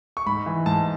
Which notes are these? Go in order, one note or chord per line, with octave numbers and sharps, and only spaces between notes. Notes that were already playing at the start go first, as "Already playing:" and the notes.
C#6
G#2 B5
E3
G#2 A5